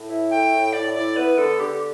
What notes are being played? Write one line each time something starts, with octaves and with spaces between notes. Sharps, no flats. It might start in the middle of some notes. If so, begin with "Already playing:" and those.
Already playing: A2
E4
A3 G5
A2
A2 D5
E4 D5
B3 B4
D3 A4
D3 G4